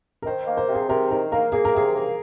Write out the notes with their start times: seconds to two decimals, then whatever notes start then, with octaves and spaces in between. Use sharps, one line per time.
0.22 A#4
0.26 D#3 C5
0.47 A#3
0.57 C5
0.68 C3
0.74 G#4
0.89 C3 A#4
1.11 D#3 A#4
1.32 A#3 A#4
1.52 A#3 G#4
1.65 A#4
1.74 C3 G#4
1.94 A#3